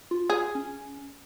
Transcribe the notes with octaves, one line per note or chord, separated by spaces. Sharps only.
F4
G#4
C#4